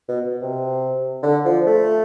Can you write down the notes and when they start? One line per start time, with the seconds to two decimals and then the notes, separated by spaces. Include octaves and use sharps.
0.09 B2
0.42 C3
1.23 D3
1.45 F3
1.67 A3